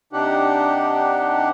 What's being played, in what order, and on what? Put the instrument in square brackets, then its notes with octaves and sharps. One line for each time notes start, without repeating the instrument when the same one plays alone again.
[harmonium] C3 D4 D#4 G4 F#5